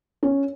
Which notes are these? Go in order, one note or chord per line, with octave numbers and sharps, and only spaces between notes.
C#4